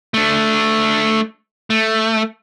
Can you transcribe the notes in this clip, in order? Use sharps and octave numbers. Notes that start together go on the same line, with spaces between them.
A3 D4
A3